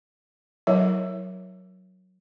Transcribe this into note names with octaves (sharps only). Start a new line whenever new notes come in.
F#3 E4 A#4 C#5 E5